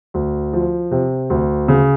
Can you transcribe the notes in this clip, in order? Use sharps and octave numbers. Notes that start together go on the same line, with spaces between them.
D2
F3
C3
D2
C#3